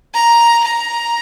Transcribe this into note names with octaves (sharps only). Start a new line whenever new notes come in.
A#5
A#5